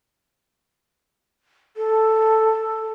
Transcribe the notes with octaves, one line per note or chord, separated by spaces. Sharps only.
A4